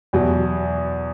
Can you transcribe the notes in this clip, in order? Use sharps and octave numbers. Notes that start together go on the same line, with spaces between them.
E2 B2 F#3